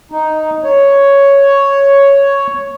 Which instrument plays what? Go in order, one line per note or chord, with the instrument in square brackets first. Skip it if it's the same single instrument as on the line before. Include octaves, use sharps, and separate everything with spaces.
[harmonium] D#4
C#5